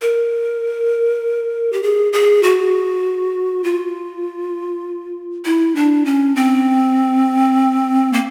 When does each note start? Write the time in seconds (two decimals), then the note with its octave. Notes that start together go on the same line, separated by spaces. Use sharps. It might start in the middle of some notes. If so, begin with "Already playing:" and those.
0.02 A#4
1.73 G4
1.83 G#4
2.13 G#4
2.43 F#4
3.64 F4
5.45 E4
5.76 D4
6.05 C#4
6.36 C4
8.13 A#3